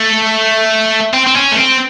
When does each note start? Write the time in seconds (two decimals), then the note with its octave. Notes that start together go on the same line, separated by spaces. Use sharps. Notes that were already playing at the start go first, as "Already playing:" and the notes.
Already playing: A3
1.13 C4
1.27 C4
1.35 C#4
1.52 A3
1.56 C4